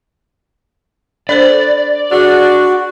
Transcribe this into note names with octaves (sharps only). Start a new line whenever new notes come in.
D4 A4 C5 D5
D4 F#4 G#4